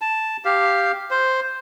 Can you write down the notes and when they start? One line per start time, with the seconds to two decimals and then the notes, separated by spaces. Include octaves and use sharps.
0.01 A5
0.45 G4 F5
1.11 C5